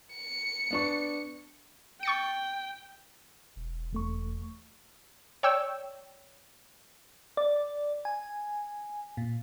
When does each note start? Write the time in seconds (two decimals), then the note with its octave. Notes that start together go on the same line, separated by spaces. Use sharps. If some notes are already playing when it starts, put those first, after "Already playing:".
0.14 C#7
0.71 B3 D4 C#6
2.03 G5 C#6 A6 C#7
3.56 E1
3.93 E2 A3 C#6
5.43 C#5 D5 G5 E6
7.37 D5
8.05 G#5
9.17 A#2